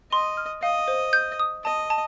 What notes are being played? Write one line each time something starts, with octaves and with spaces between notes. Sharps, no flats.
D#5 C6
F6
D#5 F5
C5
G6
D#6
D#5 A5
A5